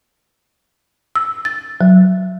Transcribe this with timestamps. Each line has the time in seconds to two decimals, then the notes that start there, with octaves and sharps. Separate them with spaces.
1.15 E6
1.45 A6
1.81 F#3